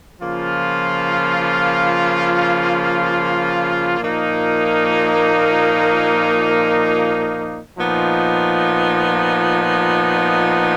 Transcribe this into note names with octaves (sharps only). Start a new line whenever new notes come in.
C#3 F3 A#3 F4
A#2 F3 A#3 D#4 A#4
A#2 F3 B3 D#4